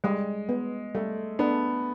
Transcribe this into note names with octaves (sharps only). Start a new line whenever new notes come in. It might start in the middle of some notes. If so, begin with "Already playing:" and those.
G3 G#3
B3
G3 A3
B3 D4